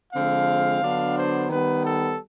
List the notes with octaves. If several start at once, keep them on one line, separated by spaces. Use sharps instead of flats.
D3 F3 G#3 C4 F5
D3 F#3 B3 D4
C5
D#3 G3 B3 B4
A4